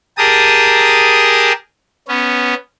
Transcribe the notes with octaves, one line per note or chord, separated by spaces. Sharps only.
G4 G#4 A#4 A5 D#6
B3 C#4